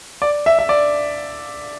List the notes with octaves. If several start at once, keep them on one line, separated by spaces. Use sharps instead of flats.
D5
E5
E5
D5